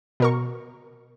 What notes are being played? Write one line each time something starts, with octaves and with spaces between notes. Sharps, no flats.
B2 A#4 C#6